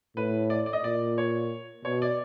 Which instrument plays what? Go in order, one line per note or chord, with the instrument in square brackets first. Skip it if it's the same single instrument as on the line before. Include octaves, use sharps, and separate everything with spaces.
[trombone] A2 [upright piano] B4
[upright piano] D5
D5
D#5
[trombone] A#2 [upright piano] D5
[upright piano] C#5
[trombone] B2 [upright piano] C#5
[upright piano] D5